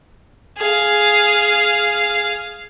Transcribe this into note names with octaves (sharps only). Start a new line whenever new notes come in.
G#4 F5